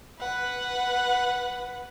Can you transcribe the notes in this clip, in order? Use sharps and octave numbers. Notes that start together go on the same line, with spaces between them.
B4 F#5